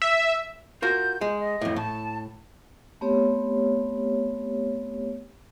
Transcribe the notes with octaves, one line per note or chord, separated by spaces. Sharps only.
E5
F4 F#4 A#4 G6
G#3
D#5
F2 A2
A2 A5
A3 B3 C4 G4 C#5